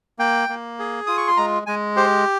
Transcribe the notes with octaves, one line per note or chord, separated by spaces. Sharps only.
A#3 G5
A#3
G#4
F4 D#6
C#6
C6
G#3 A#5
G#3 G#5
G4 C5